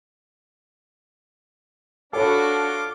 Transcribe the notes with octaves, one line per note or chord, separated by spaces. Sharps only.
D4 F4 F#4 A4 C#5 B5 D6